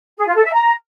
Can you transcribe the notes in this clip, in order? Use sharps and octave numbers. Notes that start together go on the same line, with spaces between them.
G#4
F4
A4
E5
A#5